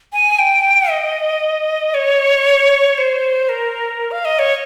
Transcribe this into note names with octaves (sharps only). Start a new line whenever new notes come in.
G#5
G5
D#5
C#5
C5
A#4
F5
D#5
C#5